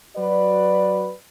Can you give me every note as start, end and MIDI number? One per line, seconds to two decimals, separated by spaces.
0.16 1.10 54
0.16 1.10 66
0.16 1.10 71
0.16 1.10 74